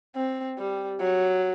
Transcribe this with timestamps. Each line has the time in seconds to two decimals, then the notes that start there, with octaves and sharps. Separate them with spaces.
0.16 C4
0.58 G3
1.01 F#3